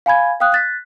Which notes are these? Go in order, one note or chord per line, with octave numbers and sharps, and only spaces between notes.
F5 G#5 B5 G#6
F5 G5 D#6 F#6
F#6 A6 B6